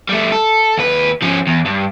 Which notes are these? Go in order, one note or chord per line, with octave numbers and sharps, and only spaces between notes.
G3 A3
A4
D#2 B4
F3 C#4
E2
G2